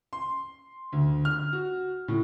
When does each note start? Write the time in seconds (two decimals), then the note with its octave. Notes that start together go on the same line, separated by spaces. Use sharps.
0.13 C6
0.92 D2
1.25 F6
1.53 F#4
2.08 A2